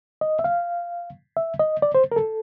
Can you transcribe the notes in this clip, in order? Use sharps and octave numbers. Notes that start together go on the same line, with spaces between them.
D#5
E5
F5
E5
D#5
D5
C5
A#4
A4